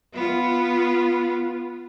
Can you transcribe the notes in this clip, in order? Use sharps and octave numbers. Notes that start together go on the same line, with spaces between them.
B3 F4